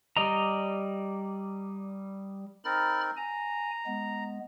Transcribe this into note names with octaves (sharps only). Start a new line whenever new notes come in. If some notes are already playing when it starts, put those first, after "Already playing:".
G3 D5 D#5 A#5
C4 D#4 A#4 B5 F6 A6
G#5 A#5
G#3 B3